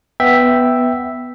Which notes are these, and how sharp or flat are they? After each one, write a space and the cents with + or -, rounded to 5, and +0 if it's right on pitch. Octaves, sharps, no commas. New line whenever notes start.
B3 +0 E5 +0 G5 +0